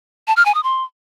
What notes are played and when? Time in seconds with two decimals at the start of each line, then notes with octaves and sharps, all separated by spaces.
0.28 A5
0.37 F6
0.46 G#5
0.55 D#6
0.64 C6